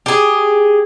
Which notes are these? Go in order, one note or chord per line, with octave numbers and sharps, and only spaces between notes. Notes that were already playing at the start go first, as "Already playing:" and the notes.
G4 G#4